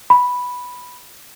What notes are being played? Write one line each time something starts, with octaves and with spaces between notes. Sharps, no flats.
B5